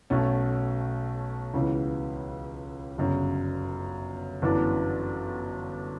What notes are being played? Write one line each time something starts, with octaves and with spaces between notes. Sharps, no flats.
B1 B2 A3 C#4
C#2 C#3 E3 B3
G1 F#2 C#3
G1 F#2 E3 B3 D4